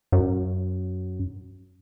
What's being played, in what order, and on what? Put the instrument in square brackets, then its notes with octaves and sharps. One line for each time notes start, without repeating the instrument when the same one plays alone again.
[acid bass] F#2